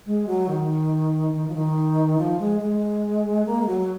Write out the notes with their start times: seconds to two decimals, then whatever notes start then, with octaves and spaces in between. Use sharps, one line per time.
0.06 G#3
0.27 F#3
0.48 D#3
1.33 D#3
1.48 F3
1.54 D#3
2.18 F3
2.39 G#3
2.60 G#3
3.46 A#3
3.62 G#3
3.67 F#3